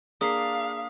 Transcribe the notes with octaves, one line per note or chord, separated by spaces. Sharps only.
A#3 D4 G#4 F5 D#6 B6 C7